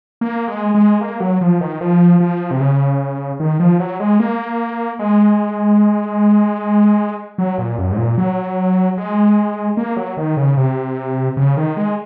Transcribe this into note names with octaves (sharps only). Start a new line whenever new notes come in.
A#3
G#3
G#3
A#3
F#3
F3
D#3
F3
F3
C3
C#3
D#3
F3
F#3
G#3
A#3
G#3
F#3
A#2
F#2
G#2
A#2
F#3
G#3
A#3
F#3
D#3
C#3
C3
C#3
D#3
G#3